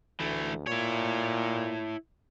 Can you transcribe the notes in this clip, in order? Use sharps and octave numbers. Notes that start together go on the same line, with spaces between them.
D2 E3 A3
A#2 E4 C#5